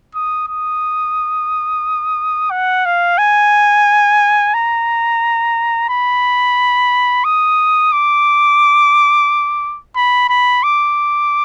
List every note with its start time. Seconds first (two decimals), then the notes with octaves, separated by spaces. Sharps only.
0.15 D#6
0.48 D#6
2.51 F#5
2.85 F5
3.18 G#5
4.54 A#5
5.89 B5
7.24 D#6
7.92 D6
9.96 B5
10.29 B5
10.63 D6